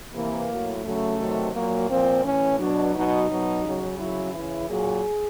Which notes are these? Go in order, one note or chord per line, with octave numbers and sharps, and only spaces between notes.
C3 E3 A#3
A2 F#3
C#3 F#3 A3
C3 D#3 F#3
A#2 F#3 A#3
A#2 F3 C4
A2 E3 C#4
B2 F#3 D4
B2 F#3 D#4
B2 F#3
C#3 F#3
C#3 F#3 E4
C#3 E3 E4
A#2 F#3 G#4